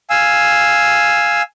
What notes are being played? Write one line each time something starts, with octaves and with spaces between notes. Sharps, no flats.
F5 G#5 E6